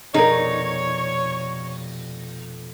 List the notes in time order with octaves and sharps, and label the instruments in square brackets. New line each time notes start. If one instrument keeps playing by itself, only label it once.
[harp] F1 B2 D5 [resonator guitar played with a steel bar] D#4 [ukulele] G#4 A#4 [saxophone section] C#5